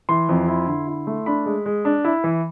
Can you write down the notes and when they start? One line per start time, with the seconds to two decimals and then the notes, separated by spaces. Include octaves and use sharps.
0.09 E3 C6
0.29 F2
0.48 E4
0.68 D3
0.88 E4
1.07 A3
1.26 D4 B5
1.46 G#3
1.66 G#3
1.85 D4
2.04 E4
2.24 E3